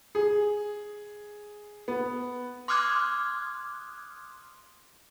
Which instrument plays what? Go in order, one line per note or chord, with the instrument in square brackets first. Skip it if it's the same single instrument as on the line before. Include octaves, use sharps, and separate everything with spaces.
[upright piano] G#4
B3
[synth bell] C6 D6 D#6 F6 F#6 G#6